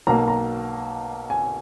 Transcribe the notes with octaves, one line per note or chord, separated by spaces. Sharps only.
B1 B2 A#3 A#5
A#5
G#5